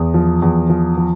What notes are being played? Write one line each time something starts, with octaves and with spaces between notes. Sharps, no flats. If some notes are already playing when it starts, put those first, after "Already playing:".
Already playing: E2
F3
E2
F3
F3